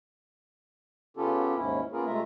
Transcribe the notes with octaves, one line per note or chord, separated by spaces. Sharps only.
C#3 B3 C#4 F4 G4 A4
D#2 G#2 C#4 E4
A#3 B3 C#4 F4 G#4 A#4
C3 G#3 A3 F4 E5 A#5